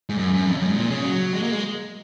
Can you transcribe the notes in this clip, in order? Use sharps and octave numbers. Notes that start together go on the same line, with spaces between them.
G#2
F#2
F#2
F2
F#2
G#2
A#2
C#3
F#3
G#3
A#3
G#3